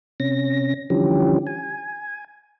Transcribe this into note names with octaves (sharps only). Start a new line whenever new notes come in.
C3 C#4 A#6
D3 E3 F3 G3 C#4 G4
G#5